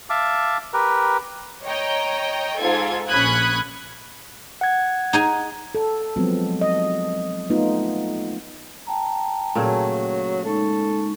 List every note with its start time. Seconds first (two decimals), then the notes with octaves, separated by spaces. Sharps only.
0.10 E5 F5 A5 D6
0.74 G4 A#4 B4
1.64 C#5 D#5 G5 A#5
2.60 G#2 F4 A4 G#6
3.09 A#1 C#4 B5 D#6 F#6 G#6
4.61 F#5 G#6
5.13 D#4 G#4 G#5
5.75 A4
6.16 F3 F#3 G#3 B3 C4
6.61 D#5
7.50 A3 B3 D#4 F4
8.87 G5 A5 A#5
9.55 A#2 C#3 F#3 A3
10.45 G#3 D#4 A4 C#6